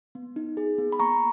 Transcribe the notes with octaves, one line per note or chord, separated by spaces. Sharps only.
B3
D#4
G#4
B3
B5
A#3 A#5 C#6